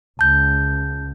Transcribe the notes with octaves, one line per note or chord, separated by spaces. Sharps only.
C#2 A5 G6